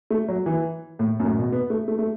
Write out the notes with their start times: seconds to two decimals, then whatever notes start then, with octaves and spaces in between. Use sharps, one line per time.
0.10 A3
0.28 F#3
0.46 E3
0.99 A2
1.20 F#2
1.25 A2
1.39 B2
1.52 B3
1.70 A3
1.88 A3
1.99 A3